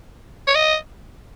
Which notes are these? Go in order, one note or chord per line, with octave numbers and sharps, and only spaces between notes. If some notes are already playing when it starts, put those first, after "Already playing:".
C#5
D#5